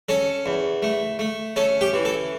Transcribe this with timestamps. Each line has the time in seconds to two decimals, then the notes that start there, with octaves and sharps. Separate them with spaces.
0.09 C#4 A4 A5
0.46 E2
0.82 A3
1.19 A3
1.56 C#4 A4 A5
1.81 G4 G5
1.93 E3
2.05 A4 A5